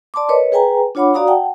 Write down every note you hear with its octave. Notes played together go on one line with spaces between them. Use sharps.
D5 A5 C6 D6
A#4 B4 C#5 D#5
G#4 B4 G5 G#5 A#5
D4 F4 C#5 F#5 B5 D6
F#4 D5 F5 A#5 D#6
F#5 G5 A5